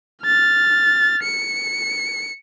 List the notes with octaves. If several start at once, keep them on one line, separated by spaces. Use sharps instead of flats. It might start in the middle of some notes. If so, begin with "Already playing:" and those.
F6 A6
C#7